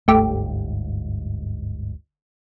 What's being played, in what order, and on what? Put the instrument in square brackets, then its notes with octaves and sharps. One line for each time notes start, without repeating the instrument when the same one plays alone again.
[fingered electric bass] G1 D2 G#2 [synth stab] A3 G4